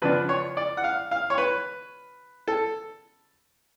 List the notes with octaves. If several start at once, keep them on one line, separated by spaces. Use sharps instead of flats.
C#3 F3 B3 D4 B4
C#5
D5
F#5
F5
F5
C#5
B4
A4